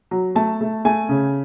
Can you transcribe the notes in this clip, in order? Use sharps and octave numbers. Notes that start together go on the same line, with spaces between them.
F#3
A3 A5
A3
A3 G#5
C#3